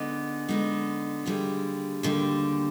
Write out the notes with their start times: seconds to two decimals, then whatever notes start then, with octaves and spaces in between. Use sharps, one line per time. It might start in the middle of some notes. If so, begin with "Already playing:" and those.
Already playing: D3 G#3 B3 D#4 D5
0.48 D3 G#3 B3 D#4
1.26 D#2 D3 G3 G#4
2.03 D#2 D3 G3